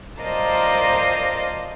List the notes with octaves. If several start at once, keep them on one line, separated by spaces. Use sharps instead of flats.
F4 A#4 C5 D5 D#5 A5